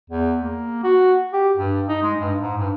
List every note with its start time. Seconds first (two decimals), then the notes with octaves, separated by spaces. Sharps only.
0.10 E2
0.42 A#3
0.84 F#4
1.33 G4
1.57 G2
1.88 D#4
2.03 G#3
2.19 G2
2.42 G#2
2.57 G2